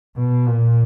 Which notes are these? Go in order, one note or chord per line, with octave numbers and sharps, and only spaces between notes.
B2
A#2